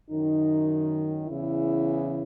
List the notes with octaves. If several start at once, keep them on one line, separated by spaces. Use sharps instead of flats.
F#2 D#3 D#4
E2 C#3 E3 E4